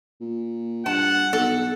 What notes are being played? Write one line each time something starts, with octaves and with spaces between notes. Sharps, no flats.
A#2
G2 F#5 A5
B1 A4